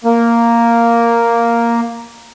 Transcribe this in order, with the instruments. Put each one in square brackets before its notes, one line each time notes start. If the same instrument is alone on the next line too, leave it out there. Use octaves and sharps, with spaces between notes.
[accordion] A#3